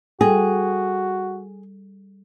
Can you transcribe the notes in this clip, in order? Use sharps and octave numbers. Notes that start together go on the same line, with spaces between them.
G3 F#4 G#4 A4 G5